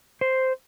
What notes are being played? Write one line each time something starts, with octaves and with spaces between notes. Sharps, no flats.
C5